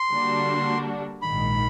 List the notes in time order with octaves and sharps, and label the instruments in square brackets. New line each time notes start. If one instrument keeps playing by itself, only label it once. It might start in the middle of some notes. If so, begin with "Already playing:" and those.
Already playing: [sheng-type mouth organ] C6
[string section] D3 G3 A#3 D4 F#4
[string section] A#1 G#2 D#3 [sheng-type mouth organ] B5